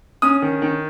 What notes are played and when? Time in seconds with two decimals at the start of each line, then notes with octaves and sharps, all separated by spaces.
0.22 C#4 D#6
0.42 D#3
0.62 D#3